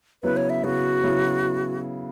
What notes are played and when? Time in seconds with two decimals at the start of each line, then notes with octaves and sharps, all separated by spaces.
0.23 C#3 F#3 B3 E4 B4
0.37 C#5
0.50 E5
0.64 C#3 F#3 B3 E4 F#4
1.03 C#3 F#3 B3 E4